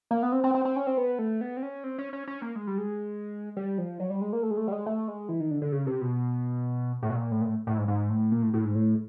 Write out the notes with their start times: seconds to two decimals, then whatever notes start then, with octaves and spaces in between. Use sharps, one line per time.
0.11 A#3
0.23 B3
0.32 C4
0.44 C4
0.55 C4
0.65 C4
0.76 C#4
0.87 C4
0.98 B3
1.19 A3
1.41 B3
1.57 C4
1.63 C#4
1.84 C4
1.98 C#4
2.13 C#4
2.27 C#4
2.42 A#3
2.56 G#3
2.67 G3
2.78 G#3
3.57 G3
3.78 F3
4.00 F#3
4.10 G3
4.21 G#3
4.33 A#3
4.43 A3
4.51 G#3
4.57 A3
4.68 G3
4.72 G#3
4.86 A3
5.08 G#3
5.29 E3
5.40 D#3
5.51 D3
5.62 D3
5.72 C#3
5.87 C3
6.01 B2
7.03 A2
7.10 B2
7.16 A#2
7.31 A2
7.41 A#2
7.45 A2
7.67 A2
7.78 G#2
7.88 G#2
8.10 A2
8.32 A#2
8.43 A2
8.54 A2
8.65 G#2
8.75 A2